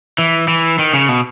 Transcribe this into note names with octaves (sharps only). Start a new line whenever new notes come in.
E3
E3
D#3
C#3
B2